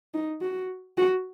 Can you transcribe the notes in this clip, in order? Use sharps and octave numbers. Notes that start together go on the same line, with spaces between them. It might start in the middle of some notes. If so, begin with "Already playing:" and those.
D#4
F#4
F#4